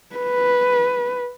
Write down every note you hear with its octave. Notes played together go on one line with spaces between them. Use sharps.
B4